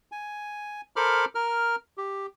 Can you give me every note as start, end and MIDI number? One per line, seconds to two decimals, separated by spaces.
0.12 0.81 80
0.96 1.25 69
0.96 1.25 70
0.96 1.25 72
0.96 1.25 83
0.96 1.25 86
0.96 1.25 89
1.35 1.76 70
1.35 1.76 89
1.97 2.26 67